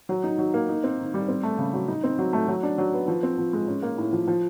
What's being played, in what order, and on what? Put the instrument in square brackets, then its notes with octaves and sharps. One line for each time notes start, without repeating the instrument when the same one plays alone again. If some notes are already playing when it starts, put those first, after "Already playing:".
[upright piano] F#3
D#4
F#3
A#3
D#4
C4
D#3
G3
C4
A3
C#3
F#3
D#4
C4
F#3
A3
F#3
D4
F#3
B3
F3
C4
F3
G#3
C#4
A#3
A2
F3
F3